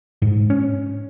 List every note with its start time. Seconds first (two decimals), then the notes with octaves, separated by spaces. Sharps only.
0.22 G#2
0.50 C#4